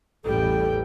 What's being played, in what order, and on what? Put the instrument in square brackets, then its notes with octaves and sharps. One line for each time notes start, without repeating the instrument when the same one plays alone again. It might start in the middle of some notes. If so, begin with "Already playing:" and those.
[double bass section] A1 E2 [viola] G3 G5 [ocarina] A4